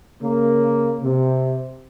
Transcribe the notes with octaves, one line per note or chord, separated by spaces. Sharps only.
C#3 A#3
C3